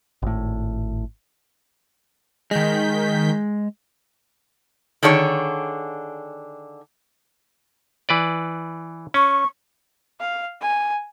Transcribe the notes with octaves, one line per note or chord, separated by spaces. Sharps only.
G#1 A2
D#3 G#3 G6 B6
D3 D#3 D4 G#4 C#5
E3 B4 D5
C#4 C#6
F5
G#5